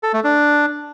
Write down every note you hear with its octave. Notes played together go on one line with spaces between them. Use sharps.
A4
A3
D4